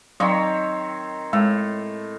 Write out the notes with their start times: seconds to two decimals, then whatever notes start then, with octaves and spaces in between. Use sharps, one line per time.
0.20 D#3 F#3 C4 C#5 F5 C6
1.33 A2 G#3